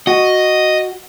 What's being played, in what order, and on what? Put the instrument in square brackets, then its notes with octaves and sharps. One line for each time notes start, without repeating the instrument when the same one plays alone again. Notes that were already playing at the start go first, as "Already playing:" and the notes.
[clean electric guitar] F#4 [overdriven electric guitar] D#5